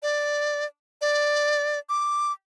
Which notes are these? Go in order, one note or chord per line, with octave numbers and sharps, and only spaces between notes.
D5
D5
D6